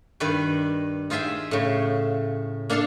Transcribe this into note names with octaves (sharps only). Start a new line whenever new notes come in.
G2 D#3 B4 D5 G5
D#4 F4 G#4 E5 G5
A2 C#3
A#3 D4 A4 F5 A5